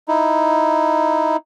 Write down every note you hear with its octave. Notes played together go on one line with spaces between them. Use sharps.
D#4 E4